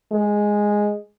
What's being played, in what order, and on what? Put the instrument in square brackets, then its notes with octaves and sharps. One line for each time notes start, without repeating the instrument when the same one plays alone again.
[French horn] G#3